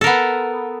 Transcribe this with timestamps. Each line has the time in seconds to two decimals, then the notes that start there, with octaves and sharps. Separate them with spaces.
0.01 A4
0.04 A#4
0.07 B3